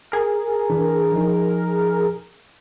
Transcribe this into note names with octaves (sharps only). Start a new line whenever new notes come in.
G#4 A#4
E3 D4
F3 D#4